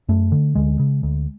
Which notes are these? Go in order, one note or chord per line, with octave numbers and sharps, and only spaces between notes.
F#2 A3
D3
D2 G#3
C#3
D2